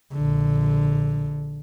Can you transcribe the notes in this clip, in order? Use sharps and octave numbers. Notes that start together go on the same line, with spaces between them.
A#1 D3